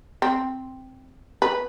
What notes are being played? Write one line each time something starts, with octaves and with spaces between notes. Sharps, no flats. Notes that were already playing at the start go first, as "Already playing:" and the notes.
C4
B4